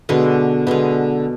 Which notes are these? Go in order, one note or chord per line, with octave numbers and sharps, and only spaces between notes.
B2 D3 G#3 B3
B2 D3 G#3 B3